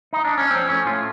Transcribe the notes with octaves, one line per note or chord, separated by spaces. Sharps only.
D#4
D4
C#4
F3 C4
A2 C#4
A2 F4